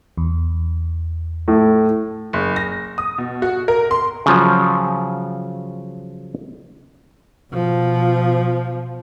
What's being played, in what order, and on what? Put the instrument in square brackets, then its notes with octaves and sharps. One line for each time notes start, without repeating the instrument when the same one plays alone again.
[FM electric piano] E2
[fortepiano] A2
[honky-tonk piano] F#1
A#6
D#6
B2
F#4
A#4
C6
[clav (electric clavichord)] C#3 F3 F#3
[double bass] B2 F3